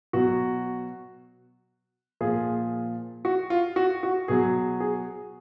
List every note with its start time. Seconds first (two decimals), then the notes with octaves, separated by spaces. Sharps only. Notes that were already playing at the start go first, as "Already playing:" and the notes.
0.13 B2 F#3 F#4
2.21 A#2 F3 G#4
3.25 F#4
3.50 F4
3.76 F#4
4.03 F#4
4.28 B2 F#3 G#4
4.80 G#4